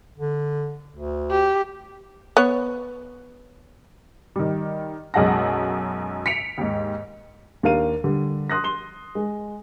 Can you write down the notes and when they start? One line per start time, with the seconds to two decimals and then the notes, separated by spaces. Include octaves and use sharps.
0.19 D3
0.94 D2
1.31 G4
2.37 B3 C#5
4.36 D#3 G3
5.14 B1 F#2 G#3 F#5 A5 A#6
6.26 B6 C#7 D7 F7
6.58 D#2 G#2
7.63 D#2 D4 A#4 F5 D#7
8.04 D3 G3
8.50 C6 D#6 F#6 A#6
8.64 C6 G7
9.15 G#3